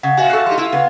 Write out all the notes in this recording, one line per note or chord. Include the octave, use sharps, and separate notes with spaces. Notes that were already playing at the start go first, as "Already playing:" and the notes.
C#3 F#5
A#2 F#4 E5 F5 G#5
A4 F5 C#6 F#6
G3 D#4 C6
E4 F4
C#3 B3